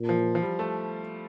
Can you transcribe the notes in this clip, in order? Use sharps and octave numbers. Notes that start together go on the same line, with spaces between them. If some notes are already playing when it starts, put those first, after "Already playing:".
Already playing: A#2
F3
F3
G3
A3